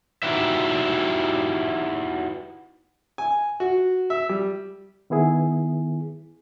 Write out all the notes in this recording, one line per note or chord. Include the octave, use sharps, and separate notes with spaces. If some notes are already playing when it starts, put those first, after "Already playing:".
D#4 E4 F#4 G4 B4 E5
G#5
F#4
E5
G3
D#3 B3 E4 G#4